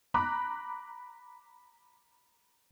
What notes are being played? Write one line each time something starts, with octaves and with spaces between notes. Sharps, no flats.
A#5 B5 D6 F#6